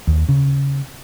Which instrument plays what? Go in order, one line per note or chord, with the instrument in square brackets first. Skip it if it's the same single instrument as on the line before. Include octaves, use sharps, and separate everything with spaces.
[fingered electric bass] D#2
C#3